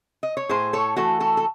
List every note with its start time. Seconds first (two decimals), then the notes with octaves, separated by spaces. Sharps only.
0.23 D#5
0.37 C#5
0.49 A2 G#4 C5
0.73 A4 C#5
0.96 E3 A3 F#4 A4
1.20 F#4 A4
1.37 A4